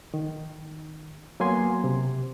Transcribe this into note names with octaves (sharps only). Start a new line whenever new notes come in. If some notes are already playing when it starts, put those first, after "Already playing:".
D#3
F#3 A#3 B3 G#5 C6
C3